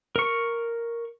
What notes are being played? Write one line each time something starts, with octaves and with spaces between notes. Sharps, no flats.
A#4 C#6